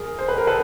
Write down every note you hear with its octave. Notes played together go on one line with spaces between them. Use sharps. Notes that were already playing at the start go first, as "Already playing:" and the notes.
Already playing: G#4 A#4
C5
B4
A#4
A4 B4